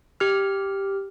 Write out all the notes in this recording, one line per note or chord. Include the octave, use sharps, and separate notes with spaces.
G4 F6